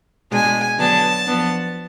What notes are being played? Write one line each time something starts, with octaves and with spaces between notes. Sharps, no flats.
B2 G#3 D4 G#5
D3 F#3 B3 D4 A5
F3 B3 D4